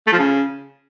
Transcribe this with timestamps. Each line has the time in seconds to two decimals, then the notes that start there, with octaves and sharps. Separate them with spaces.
0.07 A3
0.13 F3
0.19 C#3